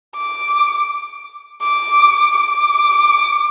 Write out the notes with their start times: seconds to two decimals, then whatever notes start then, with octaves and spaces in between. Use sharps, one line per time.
0.15 D6
1.61 D6
2.34 D6